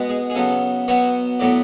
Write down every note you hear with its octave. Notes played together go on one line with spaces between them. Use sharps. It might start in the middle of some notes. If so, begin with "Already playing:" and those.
Already playing: B2 G#3 B3
G#4
G#4
C#3 F#3 B3 A4
B2 F#3 B3 C#5
A2 F#3 B3 D5